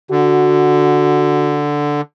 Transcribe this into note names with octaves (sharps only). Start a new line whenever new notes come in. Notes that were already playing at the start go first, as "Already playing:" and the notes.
D3 F#4